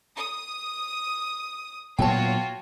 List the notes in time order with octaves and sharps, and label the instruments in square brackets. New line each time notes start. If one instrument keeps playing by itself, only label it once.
[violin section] D#6
[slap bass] A#2 F#3 B3 [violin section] F4 F#4 C#5 [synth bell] G5 A5